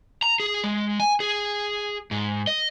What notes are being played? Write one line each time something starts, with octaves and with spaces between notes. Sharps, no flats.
A#5
G#4
G#3
G#5
G#4
G#2
D#5